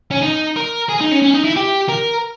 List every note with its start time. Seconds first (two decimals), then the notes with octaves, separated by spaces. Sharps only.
0.11 C#4
0.22 D#4
0.56 A#4
0.89 G#4
1.00 D#4
1.11 C#4
1.22 C#4
1.34 D#4
1.44 E4
1.56 G4
1.89 A#4